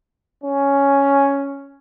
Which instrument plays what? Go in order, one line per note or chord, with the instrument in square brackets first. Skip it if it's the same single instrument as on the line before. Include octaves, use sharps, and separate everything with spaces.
[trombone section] C#4